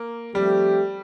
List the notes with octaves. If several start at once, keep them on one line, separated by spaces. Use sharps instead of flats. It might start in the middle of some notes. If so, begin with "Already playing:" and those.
Already playing: A#3
F3 G3 A3 C4 G4